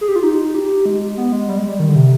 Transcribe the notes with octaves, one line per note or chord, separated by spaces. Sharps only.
G#4
G4
F4
D#4
G4
G#3
B3
G#3
G3
G#3
G3
D#3
D3
C3